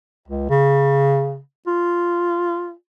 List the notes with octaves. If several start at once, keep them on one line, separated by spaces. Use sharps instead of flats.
C#2
C#3
F4